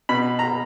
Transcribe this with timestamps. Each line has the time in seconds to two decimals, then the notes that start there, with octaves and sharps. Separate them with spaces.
0.09 B2 B5
0.39 A#5